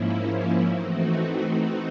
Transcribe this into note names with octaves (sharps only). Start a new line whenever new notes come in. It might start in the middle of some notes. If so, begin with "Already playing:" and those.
Already playing: G#2 F3 A#3 C#4 E4
E3 A3 C4 D#4 F#4